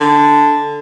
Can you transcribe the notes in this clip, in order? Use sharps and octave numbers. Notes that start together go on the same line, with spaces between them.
D3